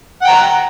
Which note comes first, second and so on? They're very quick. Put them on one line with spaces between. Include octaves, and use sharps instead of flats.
F#5 G5 A#5